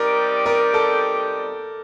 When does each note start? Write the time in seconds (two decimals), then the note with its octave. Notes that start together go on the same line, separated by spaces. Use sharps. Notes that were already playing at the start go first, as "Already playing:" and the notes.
Already playing: G3 C4 D#4 G4 A#4 D5
0.46 A#4
0.74 A4